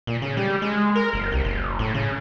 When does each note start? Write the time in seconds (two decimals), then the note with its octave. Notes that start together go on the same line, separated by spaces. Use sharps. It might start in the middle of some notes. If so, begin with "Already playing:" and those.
0.07 A#2
0.22 C#3
0.37 G3
0.62 G#3
0.96 A#4
1.13 F#1
1.32 C2
1.45 F#1
1.79 A2
1.94 C#3